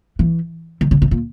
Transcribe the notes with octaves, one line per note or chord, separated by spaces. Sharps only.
E3
D#3
C#3
C3
A#2